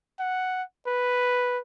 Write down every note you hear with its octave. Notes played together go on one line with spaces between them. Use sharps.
F#5
B4